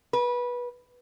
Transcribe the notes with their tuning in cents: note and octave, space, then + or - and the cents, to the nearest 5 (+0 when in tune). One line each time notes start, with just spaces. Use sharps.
B4 -20